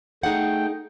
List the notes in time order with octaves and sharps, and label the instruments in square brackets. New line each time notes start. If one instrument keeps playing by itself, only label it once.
[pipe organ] A3 G5 [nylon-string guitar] D#4 G#4 F#5